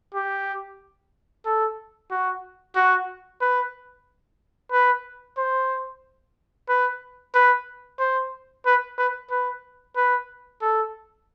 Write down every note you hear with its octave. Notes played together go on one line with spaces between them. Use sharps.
G4
A4
F#4
F#4
B4
B4
C5
B4
B4
C5
B4
B4
B4
B4
A4